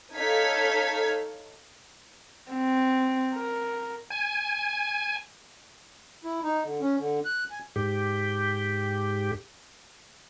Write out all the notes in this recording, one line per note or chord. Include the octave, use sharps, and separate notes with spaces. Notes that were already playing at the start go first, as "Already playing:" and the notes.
D#4 A4 C#5 F5 G#6 B6
C4
A#4
G#5
E4
D#4
D3
C#4
D3
F#6
G#5
G#2 G4